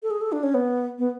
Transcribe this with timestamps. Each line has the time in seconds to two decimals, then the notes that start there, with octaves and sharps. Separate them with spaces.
0.03 A4
0.11 G#4
0.21 A4
0.32 D4
0.43 C#4
0.54 B3
0.98 B3